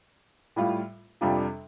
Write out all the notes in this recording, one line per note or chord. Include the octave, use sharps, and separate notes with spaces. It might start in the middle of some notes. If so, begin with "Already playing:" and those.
A2 G3 F4
F2 C3 G3 D4 F4